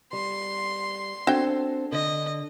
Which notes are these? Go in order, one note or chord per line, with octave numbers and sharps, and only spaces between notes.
G3 C6
C4 D4 F#4 A4 G5
D3 D#5